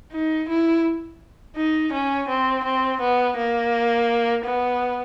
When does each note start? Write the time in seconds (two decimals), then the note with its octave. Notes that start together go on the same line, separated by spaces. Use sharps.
0.12 D#4
0.48 E4
1.56 D#4
1.93 C#4
2.28 C4
2.64 C4
3.01 B3
3.37 A#3
4.44 B3